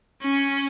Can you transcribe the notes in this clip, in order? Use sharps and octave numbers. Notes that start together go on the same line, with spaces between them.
C#4